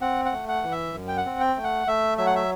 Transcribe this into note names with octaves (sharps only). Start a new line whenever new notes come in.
C4 F#5
F#5
A3
F#5
E3
E5
F#2
G5
F#5
C4
G5
A3
F#5
A3 E5
F#3 E5
F#5
E5